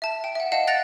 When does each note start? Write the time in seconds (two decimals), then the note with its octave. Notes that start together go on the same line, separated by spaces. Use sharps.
0.02 E5 A5
0.24 G5
0.35 E5 F#5
0.52 D#5 F5 F#5 A5
0.67 F#5 F#6 A6 A#6 D7 F7